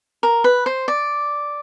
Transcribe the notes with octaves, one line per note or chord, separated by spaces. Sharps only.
A#4
B4
C5
D5